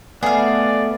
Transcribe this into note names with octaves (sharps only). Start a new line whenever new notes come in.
A3 B3 G#4 D5 F5